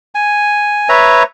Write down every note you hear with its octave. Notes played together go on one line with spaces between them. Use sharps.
G#5
B4 C#5 E5 A#5